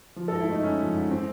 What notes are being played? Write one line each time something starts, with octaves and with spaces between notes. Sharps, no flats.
F3
A4
G#2
E4
A3 D#4
G#2 C#4
F3
G#2
E3 C4